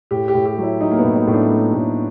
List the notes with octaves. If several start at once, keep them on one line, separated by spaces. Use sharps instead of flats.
A2 G4
G4
A2
G4
F#3
E4
F#3 D#4
A#3
B3
A2
D#4
A2
D4
A3
A2